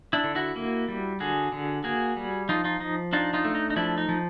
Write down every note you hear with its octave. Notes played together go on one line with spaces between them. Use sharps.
D4 E4
D3
E4 F#4
A#3
G3
D3 F#4 G#4
D3
A#3 F#4 G#4
G3
F3 D#4 F4
D#4 F4
F3 D#4
D4 D#4 F4
D#4 F4
A3
D#4
D#4
F3 D4 E4
D#4
F3